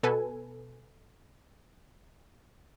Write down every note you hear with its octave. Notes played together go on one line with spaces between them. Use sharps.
B2 A4 B4 G#5